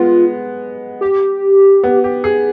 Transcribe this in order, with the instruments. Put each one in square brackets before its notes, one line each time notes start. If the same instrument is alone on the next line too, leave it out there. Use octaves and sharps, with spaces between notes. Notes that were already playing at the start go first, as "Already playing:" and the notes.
Already playing: [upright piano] G#3 B3 [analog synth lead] F4
[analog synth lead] G4
[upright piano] B3
G4
G#4